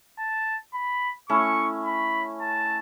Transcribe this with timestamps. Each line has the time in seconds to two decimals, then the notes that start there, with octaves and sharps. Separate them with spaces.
0.19 A5
0.74 B5
1.29 A3 C#4 E4 C#6
1.85 B5
2.41 A5